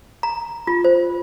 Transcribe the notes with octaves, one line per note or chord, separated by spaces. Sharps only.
A#5
F4
C5